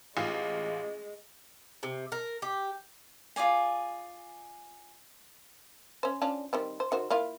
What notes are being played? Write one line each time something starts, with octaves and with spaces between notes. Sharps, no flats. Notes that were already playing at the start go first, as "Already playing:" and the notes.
A1 G#3 F4
C3
A#4
G4
F4 G#4 D5 G#5
C#4 C5
C#4 D4 F4
D#3 G3 C4
C5
D#3 F#4 C5
A#3 E4 F4